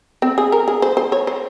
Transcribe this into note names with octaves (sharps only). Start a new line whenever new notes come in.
C4
G#4
A#4
G#4
C5
C5
C#5
C5